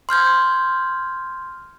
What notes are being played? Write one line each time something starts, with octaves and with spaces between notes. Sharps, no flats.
C6 F6 G6 G#6